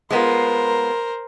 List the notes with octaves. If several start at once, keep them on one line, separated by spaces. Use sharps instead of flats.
G#3 B3 F4 A#4 C5